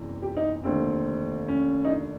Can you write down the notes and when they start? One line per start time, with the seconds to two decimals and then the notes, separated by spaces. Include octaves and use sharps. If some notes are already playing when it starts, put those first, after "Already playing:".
Already playing: F#1 E2 C3 E3
0.22 G4
0.37 D#4
0.64 F1 D#2 D3 C4
1.48 C#4
1.85 D#4
1.90 D4